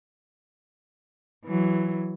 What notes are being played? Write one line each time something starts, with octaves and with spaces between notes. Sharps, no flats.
E3 F#3